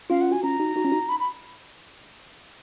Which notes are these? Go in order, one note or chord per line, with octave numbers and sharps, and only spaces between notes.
C#4 F4 F5
F#5
F#4 G#5
C#4 F4 A#5
D#4 F#4
D#4 F#4
C#4 F4
D#4 F#4
B5
B5